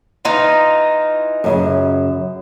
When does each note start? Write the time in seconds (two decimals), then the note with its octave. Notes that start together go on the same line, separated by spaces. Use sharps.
0.25 E3 D#4 F4
1.44 F#2 C#3